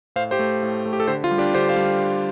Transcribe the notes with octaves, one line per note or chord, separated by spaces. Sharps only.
A2 C5 F5
G4 C5
A3
A2
A3
G4
A4
D3 G4 C5
F4
G3
D4 G4
D3 G4 C5
C5 F5
G3